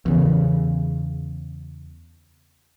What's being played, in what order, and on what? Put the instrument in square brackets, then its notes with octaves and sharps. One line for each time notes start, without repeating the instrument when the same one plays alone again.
[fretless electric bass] E2 C#3